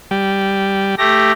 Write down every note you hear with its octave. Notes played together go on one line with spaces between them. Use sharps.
G3
A3 G4 A#6